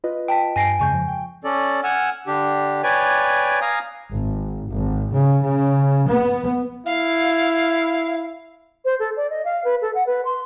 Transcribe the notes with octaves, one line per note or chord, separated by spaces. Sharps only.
F4 B4 D#5
G5 A5 B6
G2 G#5 A#6 C7 D7
F2 C#3 G#3 G#5 C#6 G6
F3
G5
C#4 A4 D5
F#5 G#5 E6 F6
D3 D4 G4
B4 C#5 D5 G5 G#5
F5 G#5 A#5 D#6
G#1
G#1
C#3
C#3
B3
E4 F5
C5
A4
D5
D#5
F5
B4
A4
F#5
B4
C6